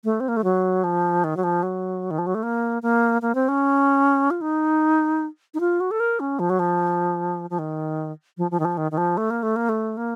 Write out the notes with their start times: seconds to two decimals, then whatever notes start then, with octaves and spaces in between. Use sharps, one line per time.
0.05 A3
0.20 C4
0.28 A#3
0.37 A3
0.44 F#3
0.84 F3
1.24 D#3
1.37 F#3
1.44 F3
1.63 F#3
2.11 D#3
2.19 F3
2.27 F#3
2.35 A3
2.43 A#3
2.83 A#3
3.22 A#3
3.35 C4
3.49 C#4
4.31 F4
4.41 D#4
5.54 D#4
5.60 F4
5.80 F#4
5.91 A4
6.00 A#4
6.20 C#4
6.39 F3
6.50 F#3
6.59 F3
7.50 F3
7.59 D#3
8.38 F3
8.51 F3
8.60 D#3
8.65 F3
8.77 D#3
8.92 D#3
8.98 F3
9.17 A3
9.30 A#3
9.43 A3
9.56 A#3
9.69 A3
9.97 A#3